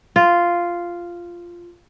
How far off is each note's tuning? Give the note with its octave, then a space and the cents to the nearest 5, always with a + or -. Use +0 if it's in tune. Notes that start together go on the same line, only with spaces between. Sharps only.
F4 -5